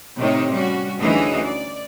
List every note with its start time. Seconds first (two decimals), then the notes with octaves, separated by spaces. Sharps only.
0.18 A2 C3 D#3 D#4 C#5
0.51 G3 C#4 F#4
1.00 D2 E3 C#4 D#4 F#4 G#4
1.43 D5